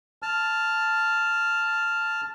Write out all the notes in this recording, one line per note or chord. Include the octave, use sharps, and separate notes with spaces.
A5 F6